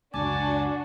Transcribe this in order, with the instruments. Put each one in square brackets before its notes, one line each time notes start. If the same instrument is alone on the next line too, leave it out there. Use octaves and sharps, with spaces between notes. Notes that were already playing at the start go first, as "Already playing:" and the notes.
[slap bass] C#2 F#2 [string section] D4 F#4 [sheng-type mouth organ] G#5 A5 [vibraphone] D6